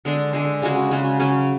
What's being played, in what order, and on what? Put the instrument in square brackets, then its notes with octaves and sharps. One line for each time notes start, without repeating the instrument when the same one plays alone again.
[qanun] D3 G#3 D4
D3 G#3 D4
C#3 G#3 C#4 F#4
C#3 G#3 C#4 F#4
C#3 F#3 C#4